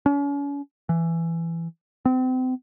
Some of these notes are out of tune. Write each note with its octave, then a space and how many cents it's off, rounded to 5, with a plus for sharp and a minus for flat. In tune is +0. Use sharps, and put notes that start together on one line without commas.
C#4 +40
E3 +15
C4 -35